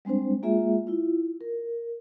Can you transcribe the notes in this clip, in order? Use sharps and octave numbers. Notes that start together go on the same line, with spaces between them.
G3 G#3 C4 D4 C5
G#3 A#3 F4 G#4 E5
E4 F4
A#4